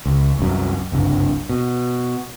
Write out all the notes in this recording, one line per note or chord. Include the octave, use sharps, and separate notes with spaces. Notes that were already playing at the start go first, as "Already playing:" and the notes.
C#2
C2 F#2
F#1 C2 G2
B2